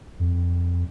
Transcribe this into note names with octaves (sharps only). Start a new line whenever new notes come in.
F2